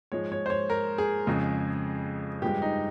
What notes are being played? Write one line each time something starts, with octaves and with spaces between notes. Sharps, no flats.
G#2 F3 G#3 C#5
C#5
C5
C#5
A#4
G#4
F2 C#3 G#3
G2 F3 G#3 G4
D#4